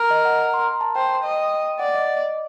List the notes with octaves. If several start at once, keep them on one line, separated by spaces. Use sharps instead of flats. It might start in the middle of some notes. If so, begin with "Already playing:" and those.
Already playing: A#4
D#5
F#5
A#5
C6
A#5
A5
C5 G5
D#5
D5 F#5
D#5